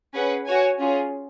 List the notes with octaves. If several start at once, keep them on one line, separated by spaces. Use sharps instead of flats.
C#4 G#4 B4 F#5
F#4 C#5 G#5
C#4 F4 G#4